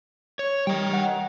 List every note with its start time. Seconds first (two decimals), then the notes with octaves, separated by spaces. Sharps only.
0.39 C#5
0.67 G3 D#5 G5
0.93 F#5